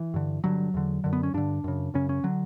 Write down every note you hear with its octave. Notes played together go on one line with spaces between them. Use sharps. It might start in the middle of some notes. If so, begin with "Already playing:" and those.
Already playing: E3
G2 D3
G2 D3 F#3
E2 D3
F#2 D3
B3
C#4
G2 D3 D4
F#2 C#3
F#2 C#3 C#4
C#4
D3 F#3